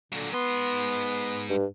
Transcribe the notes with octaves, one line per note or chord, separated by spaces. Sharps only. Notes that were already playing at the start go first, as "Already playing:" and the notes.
A#2 D3 F#3
G#2 B3 C6
G2